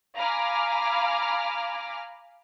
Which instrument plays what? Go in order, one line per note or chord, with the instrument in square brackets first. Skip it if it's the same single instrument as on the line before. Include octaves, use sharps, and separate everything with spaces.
[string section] F5 G#5 A#5 B5 D6 F6